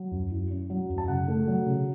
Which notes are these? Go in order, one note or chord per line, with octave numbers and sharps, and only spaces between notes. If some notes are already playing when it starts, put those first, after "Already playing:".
Already playing: F#3
F#2
E4
C#4
F#3
F#2
A5
C#3 F#5
A3
F#3
C#3